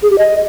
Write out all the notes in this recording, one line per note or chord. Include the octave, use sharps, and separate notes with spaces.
G#4
G4
D#5